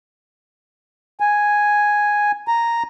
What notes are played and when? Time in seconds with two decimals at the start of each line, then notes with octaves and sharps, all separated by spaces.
1.20 G#5
2.48 A#5